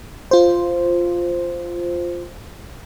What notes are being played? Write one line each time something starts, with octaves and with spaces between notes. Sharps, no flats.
F4 C5